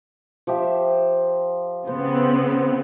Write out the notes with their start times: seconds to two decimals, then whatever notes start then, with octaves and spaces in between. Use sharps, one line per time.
0.47 F3 G4 E5
1.87 C#3 B3 C4 C5